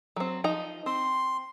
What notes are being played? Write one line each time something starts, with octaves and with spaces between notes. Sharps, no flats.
F#3 C4
F3 D#4 A#5
C4 C6